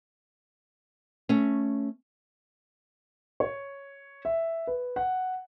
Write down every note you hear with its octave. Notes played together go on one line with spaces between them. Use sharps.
A3 C#4
C#5
E5
B4
F#5